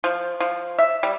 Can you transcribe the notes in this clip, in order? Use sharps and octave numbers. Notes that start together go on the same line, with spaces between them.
F3
F3
E5
G3